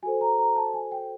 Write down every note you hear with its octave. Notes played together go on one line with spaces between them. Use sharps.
F#4 A4 C5 G#5
A#5
A#5
A5
G#5
G5